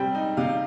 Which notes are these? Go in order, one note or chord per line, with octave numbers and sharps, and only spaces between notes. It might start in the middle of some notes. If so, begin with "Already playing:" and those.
Already playing: C3 G3 C4 G5
D#4
C3 F5